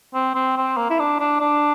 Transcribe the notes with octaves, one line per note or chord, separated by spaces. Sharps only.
C4
C4
C4
A#3
E4
D4
D4
D4